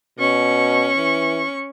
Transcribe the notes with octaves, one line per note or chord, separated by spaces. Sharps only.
B2 C#4 C#6
E3